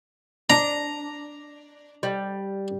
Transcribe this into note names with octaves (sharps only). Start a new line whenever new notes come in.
D4 A#5
G3